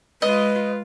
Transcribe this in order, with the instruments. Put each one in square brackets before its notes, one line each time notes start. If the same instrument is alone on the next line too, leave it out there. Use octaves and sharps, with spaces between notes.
[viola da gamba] G#3 F4 [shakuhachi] B4 [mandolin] D#5